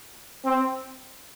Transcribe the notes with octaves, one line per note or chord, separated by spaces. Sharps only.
C4